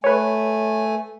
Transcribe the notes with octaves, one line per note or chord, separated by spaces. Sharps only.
A3 B4 C#5 G#5